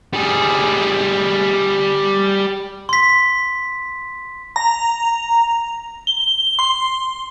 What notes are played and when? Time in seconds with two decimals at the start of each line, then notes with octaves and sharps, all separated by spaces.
0.13 G3 G#4
2.89 C6 B6
4.56 A#5
6.07 G7
6.59 C6